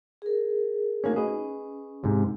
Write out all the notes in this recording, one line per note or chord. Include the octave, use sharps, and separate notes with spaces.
G#4 A#4
A3 A#3 C#4 D#4 F#4
C#4 G#4 B4 D#5
G#2 C3